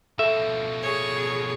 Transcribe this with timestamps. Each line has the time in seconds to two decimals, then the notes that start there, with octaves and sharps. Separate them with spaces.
0.19 B2 F3 A4 E5
0.82 G#4 C#5